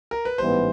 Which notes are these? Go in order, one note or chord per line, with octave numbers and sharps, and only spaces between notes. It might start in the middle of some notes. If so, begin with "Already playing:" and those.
A#4
B4
A1 G#2 E3 G3 B3 C5